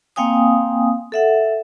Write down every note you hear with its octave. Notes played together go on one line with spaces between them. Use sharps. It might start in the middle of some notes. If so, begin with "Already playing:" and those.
A#3 C4 F5 G5 G#5 D#6
A4 E5 F#5